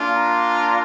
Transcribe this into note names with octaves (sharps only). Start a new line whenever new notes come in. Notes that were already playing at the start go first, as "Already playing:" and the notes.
Already playing: A#3 D4 F4
A#5